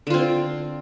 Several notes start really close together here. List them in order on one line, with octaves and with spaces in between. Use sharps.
D3 F4 C4